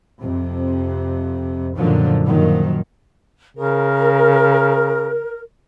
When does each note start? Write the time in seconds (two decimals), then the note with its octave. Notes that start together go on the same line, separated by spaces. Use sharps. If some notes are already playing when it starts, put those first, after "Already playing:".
0.21 F2 C3
1.78 F#2 A#2 D3 D#3 F3 F#3
2.25 F#2 A#2 D#3 F3 F#3
3.57 C#3 A#4